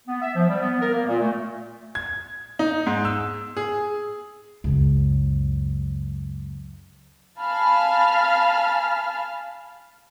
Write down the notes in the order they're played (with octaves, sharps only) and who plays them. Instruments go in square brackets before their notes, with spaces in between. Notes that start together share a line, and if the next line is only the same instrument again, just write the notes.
[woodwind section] B3
E5
F3
G3
B3
A#4
A#3
A#2
A3
[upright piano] G#6
D#4
G#2
E6
G#4
[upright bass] C#2 F#2
[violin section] F5 G#5 A5 B5 F6